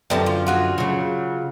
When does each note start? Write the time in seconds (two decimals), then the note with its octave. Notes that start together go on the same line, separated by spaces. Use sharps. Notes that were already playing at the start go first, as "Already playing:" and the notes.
0.10 F#2 D3 F3 G3 B3 A5
0.26 F4
0.47 F4 F#4 G#4
0.78 C#3 F#3